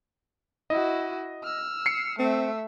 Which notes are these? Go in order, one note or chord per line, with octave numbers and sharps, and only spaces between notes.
E4 F#4 D#5
E6 F6
C7 C#7
A3 C4 E5